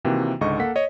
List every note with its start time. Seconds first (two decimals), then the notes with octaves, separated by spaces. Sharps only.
0.04 C3 D#3 E3 A#3 C4 F#4
0.41 C#2 G#2 D3 D#5 C#6
0.59 A#3 A4 F#5 B6
0.76 C#5 D#5